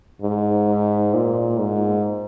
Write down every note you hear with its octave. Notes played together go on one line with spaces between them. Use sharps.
G#2
A#2
G#2